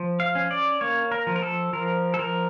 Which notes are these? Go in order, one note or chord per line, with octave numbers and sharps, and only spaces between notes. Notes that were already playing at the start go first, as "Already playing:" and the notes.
Already playing: F3
F5
C#4
D5
A#3 C#5
A#4
F3
A#4
A4
F3 A#4
A4
F3 A#4